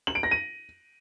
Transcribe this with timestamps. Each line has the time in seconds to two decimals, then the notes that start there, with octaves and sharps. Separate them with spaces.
0.07 F#7
0.15 D7
0.23 A#6
0.31 D#7